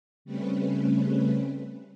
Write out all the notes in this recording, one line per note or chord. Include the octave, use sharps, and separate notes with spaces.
C#3 G3 A3 C4 C#4 B4